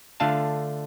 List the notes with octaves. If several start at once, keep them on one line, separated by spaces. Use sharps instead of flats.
D3 A3 D4 F4 F5 A5